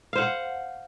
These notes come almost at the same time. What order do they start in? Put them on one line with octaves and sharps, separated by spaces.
F5 C5 F#5